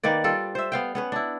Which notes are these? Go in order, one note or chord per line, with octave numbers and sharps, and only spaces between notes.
D#3 A#3 B4 D5
G3 F4 A4
C5 E5
B3 F5 G5
B3 C#4 B4
D4 E4